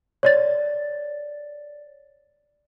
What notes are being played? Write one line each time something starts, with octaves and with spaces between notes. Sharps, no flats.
C#5 D5 A6